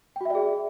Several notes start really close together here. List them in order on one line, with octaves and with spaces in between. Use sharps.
G5 F#4 E5 D5 G#4